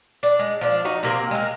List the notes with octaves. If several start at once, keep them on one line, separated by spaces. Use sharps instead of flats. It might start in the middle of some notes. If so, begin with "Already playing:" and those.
D4
G#3
F3 D4
D#4 F#4
C3 A#3 C4
G#3 A#4